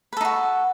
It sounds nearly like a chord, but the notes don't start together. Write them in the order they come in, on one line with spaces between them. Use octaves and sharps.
B4 A4 D#4 F#4